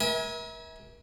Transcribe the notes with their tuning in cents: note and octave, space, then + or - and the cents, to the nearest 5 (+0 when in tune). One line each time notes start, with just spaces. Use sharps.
A#4 +40 E5 -35 G#5 +0